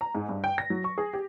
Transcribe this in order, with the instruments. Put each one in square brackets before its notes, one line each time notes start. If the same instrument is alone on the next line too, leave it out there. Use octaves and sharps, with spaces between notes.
[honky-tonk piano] A#5
G#2
G2
G5
A#6
F#3
C#6
G#4
G4